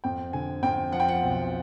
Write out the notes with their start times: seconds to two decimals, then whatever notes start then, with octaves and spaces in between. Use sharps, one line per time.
0.04 F2 G5
0.33 D3 G#5
0.63 F2 G5
0.92 F3 F#5
1.00 G5
1.09 F#5
1.22 B1